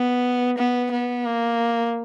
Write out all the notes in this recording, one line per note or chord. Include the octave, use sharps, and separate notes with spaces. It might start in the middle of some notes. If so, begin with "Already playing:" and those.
Already playing: B3
B3
B3
A#3